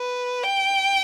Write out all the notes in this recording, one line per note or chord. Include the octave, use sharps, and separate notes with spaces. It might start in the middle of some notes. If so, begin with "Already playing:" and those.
Already playing: B4
G5